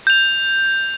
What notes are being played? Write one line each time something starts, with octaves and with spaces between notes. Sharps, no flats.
G6 F7